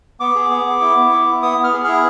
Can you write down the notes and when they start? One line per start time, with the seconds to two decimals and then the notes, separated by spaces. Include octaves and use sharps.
0.20 B3 D6
0.35 G#4
0.50 B3
0.66 B3
0.81 E4
0.97 B3
1.12 E4
1.28 E4
1.42 B3 D#6
1.58 B3
1.64 F6
1.73 G#4
1.84 E4 F6